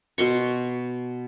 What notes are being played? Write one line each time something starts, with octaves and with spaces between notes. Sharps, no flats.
B2 C6 C#6